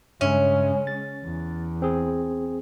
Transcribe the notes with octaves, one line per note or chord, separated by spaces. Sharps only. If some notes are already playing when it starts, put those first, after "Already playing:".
G2 C#3 G#3 C#4 E5
A6
E2
C4 G#4